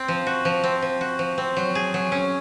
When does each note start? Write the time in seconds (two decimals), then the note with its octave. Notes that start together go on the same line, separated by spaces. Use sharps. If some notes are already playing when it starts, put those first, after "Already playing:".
Already playing: C4
0.08 F3
0.27 F#4
0.45 F3
0.64 C4
0.82 F3
1.01 F#4
1.19 F3
1.38 C4
1.57 F#3
1.75 G#4
1.94 F#3
2.12 C#4